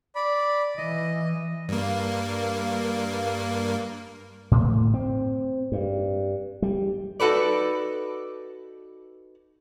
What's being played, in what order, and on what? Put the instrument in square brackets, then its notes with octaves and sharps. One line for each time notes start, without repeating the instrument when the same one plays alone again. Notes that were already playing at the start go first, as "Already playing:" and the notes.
[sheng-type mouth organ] D5 B5
[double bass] E3 [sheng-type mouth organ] D#5
[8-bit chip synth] G2 A#3
[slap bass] A2
C4
G2
G3
[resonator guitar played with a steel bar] D#4 F#4 A4 B4 D5